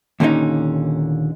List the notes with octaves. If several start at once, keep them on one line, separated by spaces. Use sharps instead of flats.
D#2 A#2 D3 C#4 D#4